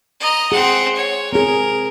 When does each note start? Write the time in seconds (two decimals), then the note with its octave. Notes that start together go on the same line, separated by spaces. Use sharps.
0.20 D#5 A#5
0.52 C4 G#4 F#5
0.95 C#5
1.33 C4 G#4 A#4